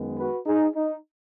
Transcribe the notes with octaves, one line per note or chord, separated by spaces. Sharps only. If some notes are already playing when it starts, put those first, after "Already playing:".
Already playing: F#2 D#3 G#3 B3
F#4 B4
D#4 G#4
D#4